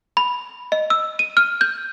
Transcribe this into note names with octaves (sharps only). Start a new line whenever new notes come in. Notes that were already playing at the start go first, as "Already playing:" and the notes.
B5
D#5
E6
D#7
F6
G6